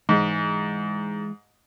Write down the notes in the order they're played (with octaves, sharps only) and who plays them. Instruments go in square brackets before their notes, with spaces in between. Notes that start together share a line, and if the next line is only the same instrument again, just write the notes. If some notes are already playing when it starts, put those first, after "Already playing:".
[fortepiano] G#2 [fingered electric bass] E3 G#3